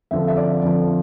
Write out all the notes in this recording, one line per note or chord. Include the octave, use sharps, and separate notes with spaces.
F2 D3 F3 E5
E5
D5
F2 D3 F3